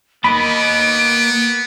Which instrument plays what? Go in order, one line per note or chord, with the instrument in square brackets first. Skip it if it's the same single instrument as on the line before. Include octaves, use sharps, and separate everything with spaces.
[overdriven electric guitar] A#3 D#5 [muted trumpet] B3 [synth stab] B5 [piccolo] D7